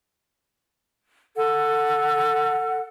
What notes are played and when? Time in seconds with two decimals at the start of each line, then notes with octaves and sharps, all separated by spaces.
1.37 A4 F#5